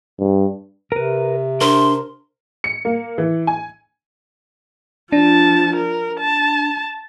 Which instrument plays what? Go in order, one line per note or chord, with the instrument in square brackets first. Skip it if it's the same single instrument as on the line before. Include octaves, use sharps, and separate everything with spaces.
[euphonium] G2
[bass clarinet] C3 [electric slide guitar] A#4 B4
[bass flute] D4 [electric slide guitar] A#4 C5 [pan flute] C6
[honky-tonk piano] C#7
A#3
E3
G#5
[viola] F3 A5 [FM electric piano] D4
[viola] A#4
A5